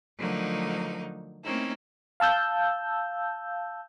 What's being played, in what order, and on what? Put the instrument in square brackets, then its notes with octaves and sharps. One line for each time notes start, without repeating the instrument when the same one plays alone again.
[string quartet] D3 F3 F#3 A3 A#3 D#4
A3 A#3 C4 C#4 D#4 E4
[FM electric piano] F5 A5 E6 G6